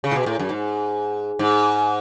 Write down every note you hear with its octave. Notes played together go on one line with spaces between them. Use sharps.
C#3
A2
B2
A2
F#2
G#2
G#2